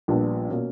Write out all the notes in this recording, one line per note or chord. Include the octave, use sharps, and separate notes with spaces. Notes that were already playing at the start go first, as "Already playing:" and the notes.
A#1 A#2 G3 B3 D4
B2 A#3 C#4